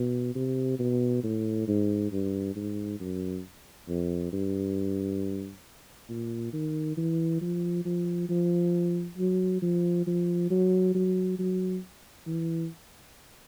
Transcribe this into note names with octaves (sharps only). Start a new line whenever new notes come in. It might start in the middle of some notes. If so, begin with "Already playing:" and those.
Already playing: B2
C3
B2
A2
G#2
G2
G#2
F#2
F2
G2
A#2
D#3
E3
F3
F3
F3
F#3
F3
F3
F#3
F#3
F#3
E3